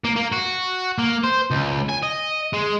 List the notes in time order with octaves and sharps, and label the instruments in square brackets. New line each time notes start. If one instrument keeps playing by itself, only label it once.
[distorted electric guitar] A#3
A#3
F#4
A#3
C5
C#2
G#5
D#5
G#3